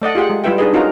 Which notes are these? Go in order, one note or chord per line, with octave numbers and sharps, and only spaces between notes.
A3 D5 D#5 F#5
F4 G4 G#4 F#5
G#3
G3 E4 F4 B4 E5 G5
D4 D#4 G#4 B4 D#5
C#4 D#4 F4 F#4 A#4 A#5